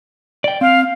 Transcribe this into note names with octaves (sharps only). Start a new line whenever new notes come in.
D5 G5
C4 F5